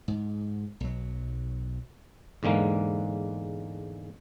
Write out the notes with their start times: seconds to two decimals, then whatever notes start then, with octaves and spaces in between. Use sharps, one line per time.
0.08 G#2
0.80 B1 F#3
2.43 E2 G#2 D3 G#3 A#3